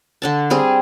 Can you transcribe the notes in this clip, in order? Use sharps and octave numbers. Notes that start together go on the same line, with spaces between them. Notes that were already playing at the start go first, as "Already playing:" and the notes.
D3 D4 A5
G3 C4 G#4